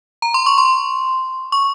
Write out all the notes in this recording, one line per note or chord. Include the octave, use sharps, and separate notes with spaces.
A#5
C6
C#6
C6
C#6